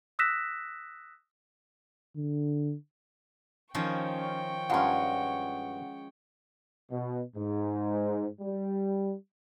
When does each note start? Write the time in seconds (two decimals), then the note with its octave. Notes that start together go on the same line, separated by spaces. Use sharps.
0.19 D#6 E6 F#6 A#6 B6 E7
2.17 D3
3.75 D#3 F3 C#4 G5 C#6
4.70 G2 G#3 C#4 F4 F5 F#5
6.91 B2
7.36 G#2
8.41 G3